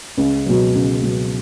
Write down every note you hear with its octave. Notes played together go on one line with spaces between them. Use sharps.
C#2
B2 F#3
C#2
B2 F#3